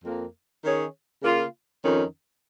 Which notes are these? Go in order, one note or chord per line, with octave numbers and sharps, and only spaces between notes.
F2 F3 A#3
D#3 C#4 G#4 C#5
C#3 A#3 F4
F2 D#3 C#4